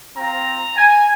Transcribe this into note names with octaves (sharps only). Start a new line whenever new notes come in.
C4 F4 A#5
G#5